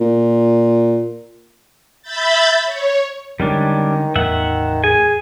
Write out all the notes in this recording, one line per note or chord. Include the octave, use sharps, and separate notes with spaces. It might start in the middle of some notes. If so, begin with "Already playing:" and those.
A#2
E5 B5 G6 A6
C#5
D3 D#3 G3 G#3 C#4 D4
E2 A2 D#3 E5 F#5
G#4 G#5